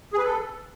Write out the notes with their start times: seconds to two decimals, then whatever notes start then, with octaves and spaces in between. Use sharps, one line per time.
0.13 G#4
0.19 B4
0.24 A4